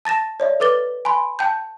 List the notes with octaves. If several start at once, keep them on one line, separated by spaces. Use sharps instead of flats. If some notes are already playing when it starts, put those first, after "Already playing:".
A5 A6 A#6 E7
C#5 D5 E5
A4 B4 D6 A6 G7
G#5 B5 C6
G5 A5 G6